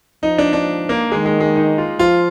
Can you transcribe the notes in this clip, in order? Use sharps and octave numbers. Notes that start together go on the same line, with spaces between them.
F3 D#4
D4
D4
A#3
D#3 G#3
G#3
G#3
D#4
F4
F3 F4